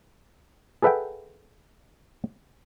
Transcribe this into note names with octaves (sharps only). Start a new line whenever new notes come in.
G#4 A4 B4 E5 F#5 G5